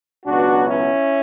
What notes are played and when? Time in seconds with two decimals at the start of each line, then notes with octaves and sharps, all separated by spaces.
0.25 C#2 B2 F#3 B3 D4 F#4
0.67 C#4 E4